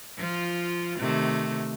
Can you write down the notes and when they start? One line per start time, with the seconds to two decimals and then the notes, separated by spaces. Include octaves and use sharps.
0.18 F3 F4
0.98 C3 D#3 A3